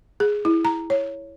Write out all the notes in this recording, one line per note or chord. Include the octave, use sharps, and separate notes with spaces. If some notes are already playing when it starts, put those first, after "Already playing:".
G#4
E4
A#5
C#5